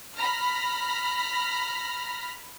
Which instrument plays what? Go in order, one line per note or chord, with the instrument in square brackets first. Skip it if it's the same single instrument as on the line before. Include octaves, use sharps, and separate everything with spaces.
[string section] A#5 B5 F6 A#6